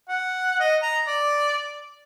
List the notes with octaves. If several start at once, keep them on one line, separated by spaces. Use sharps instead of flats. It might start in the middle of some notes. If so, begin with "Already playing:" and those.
F#5
D#5
A#5
D5